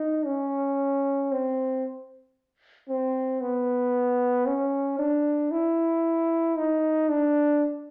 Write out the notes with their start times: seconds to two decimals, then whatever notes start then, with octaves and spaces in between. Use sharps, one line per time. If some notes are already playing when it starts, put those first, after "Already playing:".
Already playing: D#4
0.26 C#4
1.32 C4
2.89 C4
3.41 B3
4.46 C#4
4.99 D4
5.51 E4
6.56 D#4
7.09 D4